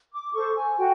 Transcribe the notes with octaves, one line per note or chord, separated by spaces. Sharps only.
D6
A4 C5 C#6
G#5
F#4 G5